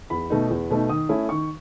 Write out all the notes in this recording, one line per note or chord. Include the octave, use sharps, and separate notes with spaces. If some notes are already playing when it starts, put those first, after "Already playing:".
E2 B5
B2 A3 D#4
E2
B2 A3 D#4
D#3 D#6
A3 C#4 E4
D#3 C#6